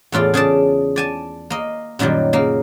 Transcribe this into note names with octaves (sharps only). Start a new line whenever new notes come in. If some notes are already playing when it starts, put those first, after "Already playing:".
E2 A2 F4 D5
C#3 G#4 D5 A5
D5 G#5 A5
A#3 D#5
F#2 A#2 D#3 F#3 G3
C#3 A#3